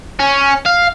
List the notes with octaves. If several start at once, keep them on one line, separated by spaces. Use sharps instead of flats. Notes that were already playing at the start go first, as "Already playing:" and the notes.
C#4
F5